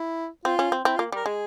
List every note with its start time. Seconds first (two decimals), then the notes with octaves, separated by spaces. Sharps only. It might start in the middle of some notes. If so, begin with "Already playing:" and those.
Already playing: E4
0.45 C4 F4
0.59 C#4
0.72 C4
0.85 C4 E4
0.96 F4
0.99 A#3
1.12 G3 A#4
1.26 G#3 G#4